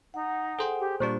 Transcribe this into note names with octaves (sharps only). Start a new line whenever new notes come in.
D#4 F#5
G#4 A4 C5 G5
G4
A#2 G3 D4 C5 C#6